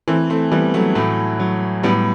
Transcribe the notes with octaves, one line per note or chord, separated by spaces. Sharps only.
E3 A3 C4
A3 C4
E3 G3 B3
F#3 A3
A2 F#3 A3
F#3
A2 G3 B3